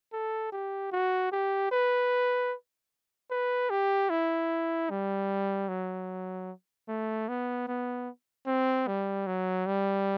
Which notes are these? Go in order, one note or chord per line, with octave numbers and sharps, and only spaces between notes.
A4
G4
F#4
G4
B4
B4
G4
E4
G3
F#3
A3
B3
B3
C4
G3
F#3
G3